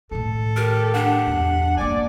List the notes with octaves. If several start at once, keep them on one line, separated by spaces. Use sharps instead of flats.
A2 D#3 A4
G4 A#4
D4 F#5
E2 F3
A3 A#3 D5 G#5